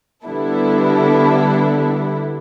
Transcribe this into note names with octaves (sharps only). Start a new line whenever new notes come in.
D3 G3 B3 D4 E4 A4